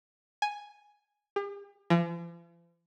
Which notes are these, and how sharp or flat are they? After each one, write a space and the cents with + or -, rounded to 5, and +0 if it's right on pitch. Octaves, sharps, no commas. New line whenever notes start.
G#5 +0
G4 +45
F3 -45